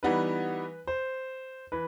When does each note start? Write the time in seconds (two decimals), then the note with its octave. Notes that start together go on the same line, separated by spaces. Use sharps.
0.03 E3 G3 B3 D#4 B4
0.87 C5
1.72 E3 B4